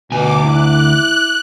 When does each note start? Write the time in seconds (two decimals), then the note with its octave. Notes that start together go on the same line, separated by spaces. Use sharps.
0.12 D2 B2 G#5 D6
0.43 E4 F#6